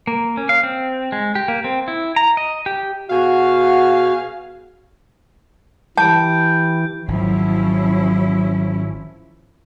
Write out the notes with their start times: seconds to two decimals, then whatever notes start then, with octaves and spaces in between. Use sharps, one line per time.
0.07 A#3
0.37 C#4
0.49 F5
0.63 C4
1.12 G#3
1.35 G4
1.48 A#3
1.64 C4
1.88 E4
2.16 A#5
2.37 D#5
2.66 G4
3.10 B2 F#4 G#4 F5
5.98 E3 G4 G5 A5 B5 G6 D7
7.08 G#1 F3 F#3 C#4 E4